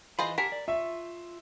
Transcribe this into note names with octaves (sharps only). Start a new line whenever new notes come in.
E3 F4 G#4 C5 D#5 B5
G4 A#4 F#5 G#5 A5 B6
D5
F4 E5 C#6